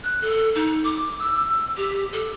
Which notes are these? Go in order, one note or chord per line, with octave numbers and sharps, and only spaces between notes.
F#6
A4
D#4
D6
E6
G4
A4